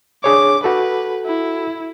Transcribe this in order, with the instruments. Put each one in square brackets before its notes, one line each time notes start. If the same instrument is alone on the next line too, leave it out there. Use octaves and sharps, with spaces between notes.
[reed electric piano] D4 G#4 C#5 [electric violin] D6
[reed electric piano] F#4 A4 [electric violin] B4
[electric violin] E4